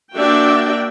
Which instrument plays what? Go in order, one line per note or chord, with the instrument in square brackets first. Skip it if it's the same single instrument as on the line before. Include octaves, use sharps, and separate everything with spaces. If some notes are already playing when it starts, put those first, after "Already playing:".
[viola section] A#3 D4 F#4 D5 E5 G5